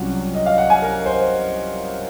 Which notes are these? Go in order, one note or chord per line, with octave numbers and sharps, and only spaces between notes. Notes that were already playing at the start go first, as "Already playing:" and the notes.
Already playing: C2 C3 F#3 C#4 F4 F#5
D#5
F5
F#5
G#5
A#4
C5